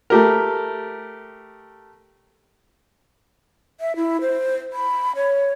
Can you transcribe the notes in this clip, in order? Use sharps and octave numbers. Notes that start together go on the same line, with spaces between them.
A3 G4 A#4
E5
E4
C5
B5
C#5